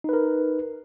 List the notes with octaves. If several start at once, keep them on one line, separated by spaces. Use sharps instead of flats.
D#4 A#4 B4